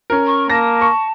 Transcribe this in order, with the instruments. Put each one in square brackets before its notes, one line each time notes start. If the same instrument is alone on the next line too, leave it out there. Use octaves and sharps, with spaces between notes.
[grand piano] C#4 A#4
[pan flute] C#6
[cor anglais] A#3 [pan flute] A5 [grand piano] A#6
[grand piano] C#6